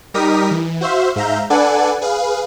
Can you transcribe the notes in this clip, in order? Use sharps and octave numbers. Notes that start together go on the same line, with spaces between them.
G3 D#4 G4 A#4 D#6 B6
E3
F#4 C5 E5 F5
G#2 E5 F5 A#5 G6
D4 A4 B4 D5 F#5 G#5
G#4 B4 F5